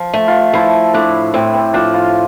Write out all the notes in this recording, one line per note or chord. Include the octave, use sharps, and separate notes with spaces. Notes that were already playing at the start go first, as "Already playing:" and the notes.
Already playing: F3
A3
F4
F3 E4
A2 D4
A2 C4
C4
F3 D4
F4